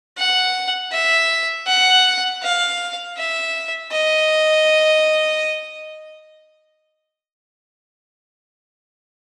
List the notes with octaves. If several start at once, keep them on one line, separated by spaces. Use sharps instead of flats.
F#5
E5
F#5
F5
E5
D#5